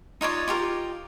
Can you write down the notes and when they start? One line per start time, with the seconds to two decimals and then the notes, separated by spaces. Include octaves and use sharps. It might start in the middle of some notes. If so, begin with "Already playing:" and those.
0.21 D#4 F4 C#5 D5
0.48 F4 G4 A#4